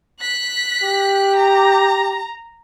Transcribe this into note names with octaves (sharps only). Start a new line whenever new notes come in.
F#6 B6
G4
A#5